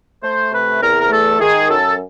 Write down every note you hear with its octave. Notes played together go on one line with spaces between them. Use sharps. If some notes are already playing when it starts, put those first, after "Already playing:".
A3 C5
C3 B4
E2 A#4
A#4
A3 A4
D#3 G#4
F#2 A4